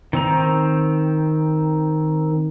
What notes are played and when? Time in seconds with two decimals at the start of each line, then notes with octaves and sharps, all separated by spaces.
0.13 D#3 C4 A#5